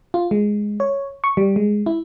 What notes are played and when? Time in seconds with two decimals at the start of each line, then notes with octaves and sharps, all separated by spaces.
0.14 F4
0.31 G#3
0.80 C#5
1.24 C#6
1.37 G3
1.56 G#3
1.86 E4